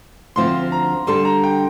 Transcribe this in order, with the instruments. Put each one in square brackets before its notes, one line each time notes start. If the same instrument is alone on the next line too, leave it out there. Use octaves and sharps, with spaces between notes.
[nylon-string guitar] D2 D3 F3 C4 F4 [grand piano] C6
[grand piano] A#5
[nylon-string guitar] D3 G3 D4 A4 [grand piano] C6
[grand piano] A#5
G5